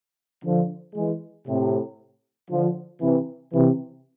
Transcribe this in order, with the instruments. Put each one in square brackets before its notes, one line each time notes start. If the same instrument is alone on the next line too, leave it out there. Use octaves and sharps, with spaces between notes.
[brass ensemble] D3 F3
E3 G#3
A2 C3
D3 F3
C3 E3
C3 E3